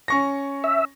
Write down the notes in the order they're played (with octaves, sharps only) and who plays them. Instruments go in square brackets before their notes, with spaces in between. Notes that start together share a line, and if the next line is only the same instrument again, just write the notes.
[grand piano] C#4 C#6 A#6
[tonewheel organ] E5